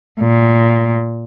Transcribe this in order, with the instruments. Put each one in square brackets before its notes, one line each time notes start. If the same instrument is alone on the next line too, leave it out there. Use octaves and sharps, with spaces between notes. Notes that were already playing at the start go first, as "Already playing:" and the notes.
[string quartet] A#2